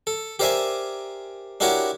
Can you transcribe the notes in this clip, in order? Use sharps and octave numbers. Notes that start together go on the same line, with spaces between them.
A4
G4 A#4 C5 D5 E5 G#5
D4 E4 F#4 G4 A#4 C#5